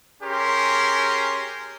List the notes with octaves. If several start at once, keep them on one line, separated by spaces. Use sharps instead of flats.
C#4 G4 G#4 A#4 C6